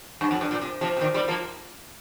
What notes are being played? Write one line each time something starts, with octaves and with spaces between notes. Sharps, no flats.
G2
F2
G2
A#2
C3
C3 F3
C3
A#2 D#3
G3 C4
F3 A#3